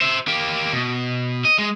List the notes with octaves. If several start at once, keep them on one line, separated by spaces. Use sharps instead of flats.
C5 E5
A#3 G4
B2
D#5
G#3